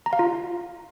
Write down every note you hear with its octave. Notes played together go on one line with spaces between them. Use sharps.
A#5
F5
F4